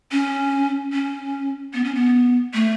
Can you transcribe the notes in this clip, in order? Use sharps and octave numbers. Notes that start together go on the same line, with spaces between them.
C#4
C#4
B3
C#4
B3
A3